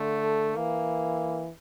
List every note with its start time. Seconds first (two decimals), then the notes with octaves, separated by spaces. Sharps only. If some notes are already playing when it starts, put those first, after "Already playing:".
Already playing: D3 A3
0.56 E3 A#3